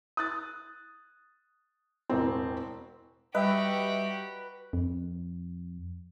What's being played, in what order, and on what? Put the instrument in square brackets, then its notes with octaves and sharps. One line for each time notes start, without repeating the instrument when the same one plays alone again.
[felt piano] D#6 F#6 A6
E1 A1 C4
[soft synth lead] G3 [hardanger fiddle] F#4 G4 [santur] B4 [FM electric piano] D#5 E5 G5
[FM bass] F2